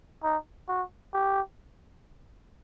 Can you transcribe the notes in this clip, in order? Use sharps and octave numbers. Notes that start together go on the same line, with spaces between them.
D#4
F#4
G4